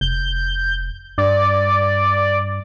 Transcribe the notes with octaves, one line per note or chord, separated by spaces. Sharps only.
F1 G6
G2 D5